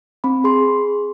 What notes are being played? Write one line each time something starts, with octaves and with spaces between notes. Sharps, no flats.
C4 B5
G#4 C6